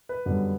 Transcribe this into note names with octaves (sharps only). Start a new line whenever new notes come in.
B4
F#2 D3 G3 B3